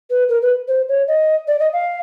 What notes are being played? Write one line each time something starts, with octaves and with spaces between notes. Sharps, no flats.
B4
A#4
B4
C5
C#5
D#5
D5
D#5
F5